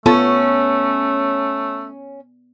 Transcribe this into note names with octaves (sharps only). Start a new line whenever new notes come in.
A3 B3 C#4 F4 A4 A5